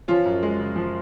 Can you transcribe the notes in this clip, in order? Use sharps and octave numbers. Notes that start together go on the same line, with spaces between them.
F3 C#4 F4
F#2
G#3
C#3
F3